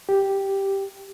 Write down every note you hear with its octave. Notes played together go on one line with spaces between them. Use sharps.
G4